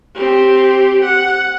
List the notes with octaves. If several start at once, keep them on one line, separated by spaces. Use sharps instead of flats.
C4 G4
F#5